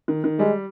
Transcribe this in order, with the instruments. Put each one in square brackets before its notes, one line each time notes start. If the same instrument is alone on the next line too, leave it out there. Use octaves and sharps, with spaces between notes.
[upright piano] D#3
D#3
[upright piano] G3 [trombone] G#3